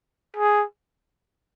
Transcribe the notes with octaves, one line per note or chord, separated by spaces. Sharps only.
G#4